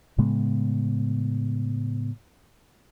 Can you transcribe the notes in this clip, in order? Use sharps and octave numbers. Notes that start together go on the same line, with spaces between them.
A2 C#3 G#3 B3